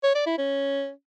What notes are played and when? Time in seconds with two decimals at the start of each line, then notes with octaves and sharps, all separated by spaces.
0.04 C#5
0.15 D5
0.26 E4
0.38 C#4